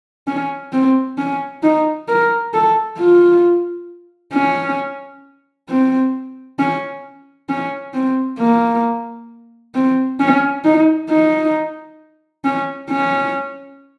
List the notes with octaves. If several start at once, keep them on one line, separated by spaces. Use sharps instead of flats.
C#4
C4
C#4
D#4
A#4
A4
F4
C#4
C4
C#4
C#4
C4
A#3
C4
C#4
D#4
D#4
C#4
C#4